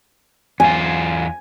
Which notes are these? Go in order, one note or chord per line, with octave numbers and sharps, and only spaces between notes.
E2 F4 G#5